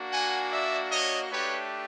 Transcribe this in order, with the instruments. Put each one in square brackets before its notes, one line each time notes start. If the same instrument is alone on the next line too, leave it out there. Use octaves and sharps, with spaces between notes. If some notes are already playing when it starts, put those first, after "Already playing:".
Already playing: [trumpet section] A#3 D4 F#4
F#5 G#5
D5 E5
C#5 D#5
A3 D4 G4 B4 C#5